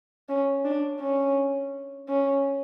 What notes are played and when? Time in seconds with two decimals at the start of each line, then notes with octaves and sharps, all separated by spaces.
0.29 C#4
0.65 D4
1.01 C#4
2.09 C#4